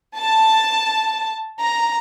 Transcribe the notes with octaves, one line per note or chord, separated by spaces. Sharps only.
A5
A#5